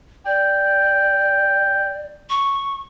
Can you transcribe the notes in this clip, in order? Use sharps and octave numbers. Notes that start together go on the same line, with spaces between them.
D5 G5
C#6